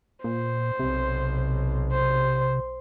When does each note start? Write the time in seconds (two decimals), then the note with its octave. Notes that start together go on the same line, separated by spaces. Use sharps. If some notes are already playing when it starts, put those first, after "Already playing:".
0.24 A#2 C5
0.79 B1 C3
1.92 C5